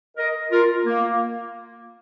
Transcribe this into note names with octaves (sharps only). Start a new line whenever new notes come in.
A#4 D#5
F4 A#4
A#3